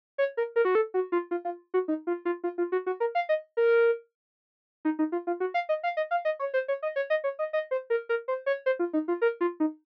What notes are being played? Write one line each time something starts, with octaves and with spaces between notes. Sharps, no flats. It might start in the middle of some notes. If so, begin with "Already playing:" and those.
C#5
A#4
A#4
F#4
A4
F#4
F4
F4
F4
F#4
D#4
F4
F4
F4
F4
F#4
F#4
A#4
F5
D#5
A#4
D#4
D#4
F4
F4
F#4
F5
D#5
F5
D#5
F5
D#5
C#5
C5
C#5
D#5
C#5
D#5
C#5
D#5
D#5
C5
A#4
A#4
C5
C#5
C5
F4
D#4
F4
A#4
F4
D#4